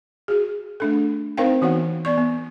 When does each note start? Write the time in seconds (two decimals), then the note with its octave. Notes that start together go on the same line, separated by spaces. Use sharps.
0.28 F#4 G#4
0.80 A3 D4 A4
1.37 C4 D#4 A#4 C5 F5 G5
1.62 E3 B3 D#4 F#4 F#5
2.05 B3 D5 C#6
2.18 B3